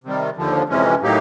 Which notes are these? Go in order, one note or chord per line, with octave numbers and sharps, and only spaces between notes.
C3 D#3 G3
D#2 D3 F3
F2 C3 E3 G#3 C#4
A2 F#3 A#3 D#4 G4